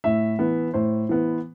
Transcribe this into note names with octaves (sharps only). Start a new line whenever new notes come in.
A2 E5
E3 B3
A2 C5
E3 B3